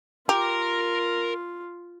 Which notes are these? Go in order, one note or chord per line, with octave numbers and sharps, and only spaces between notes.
F4 G4 A#4 A#5